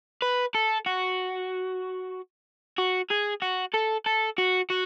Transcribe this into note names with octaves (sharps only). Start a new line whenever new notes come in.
B4
A4
F#4
F#4
G#4
F#4
A4
A4
F#4
F#4